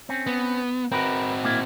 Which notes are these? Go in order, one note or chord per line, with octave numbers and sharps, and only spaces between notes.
C4 C#4
B3
C4 F#4 A#4 B4
A#2 A#3 E4